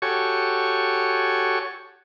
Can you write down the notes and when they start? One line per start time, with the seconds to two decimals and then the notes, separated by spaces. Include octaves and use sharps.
0.02 F#4 G4 A4 C#5 G#5 C#6